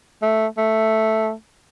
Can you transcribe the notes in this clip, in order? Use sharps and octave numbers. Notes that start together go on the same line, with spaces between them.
A3
A3